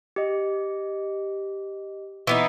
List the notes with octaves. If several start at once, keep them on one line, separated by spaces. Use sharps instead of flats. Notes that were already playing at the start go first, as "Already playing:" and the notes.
G4 D#5
E3 B3 D#4